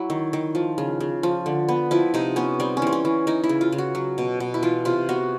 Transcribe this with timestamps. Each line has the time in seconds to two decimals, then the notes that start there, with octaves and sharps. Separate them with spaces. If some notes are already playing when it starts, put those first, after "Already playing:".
Already playing: F#3 E4
0.10 D#3
0.33 D#3
0.55 F3
0.78 C#3
1.00 C#3
1.23 F3
1.46 D3
1.68 B3
1.91 F3 E4
2.14 C3 D#4
2.36 B3 C#4
2.60 G3 C4
2.77 C#4
2.82 E3 C4
2.93 C#4
3.05 E3
3.27 E3 D#4
3.44 E4
3.49 C#3
3.61 F4
3.72 C#3
3.78 F#4
3.95 F#3
4.18 B2
4.40 B2
4.54 E4
4.62 E3 F4
4.85 C3 F4
5.09 B3 F#4